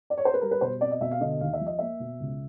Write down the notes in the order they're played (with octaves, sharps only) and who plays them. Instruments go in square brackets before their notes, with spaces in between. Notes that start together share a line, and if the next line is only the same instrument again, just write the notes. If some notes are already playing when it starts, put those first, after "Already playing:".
[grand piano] D5
C#5
C5
B4
G3 A#4
B4
B2 C5
C4 D5
D#5
B2 E5
F5
D3 D#5
D#2 F5
E5
F3
D#5
A#3 E5
B2
C#2